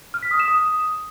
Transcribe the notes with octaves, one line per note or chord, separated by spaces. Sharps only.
F6
B6
D#6
E7
D#6